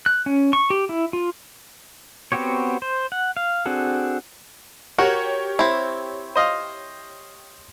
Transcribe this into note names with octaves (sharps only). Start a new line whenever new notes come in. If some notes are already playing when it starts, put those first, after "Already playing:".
F#6
C#4
C#6
G4
E4
F4
B3 C4 F#4 G4 C#5
C5
F#5
F5
C4 D4 F#4 G#4 A4
F#4 G4 A#4 C#5
C4 E4
C5 D#5 F5